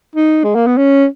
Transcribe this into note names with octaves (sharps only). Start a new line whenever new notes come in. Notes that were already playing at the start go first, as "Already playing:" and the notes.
D#4
G#3
A#3
B3
C#4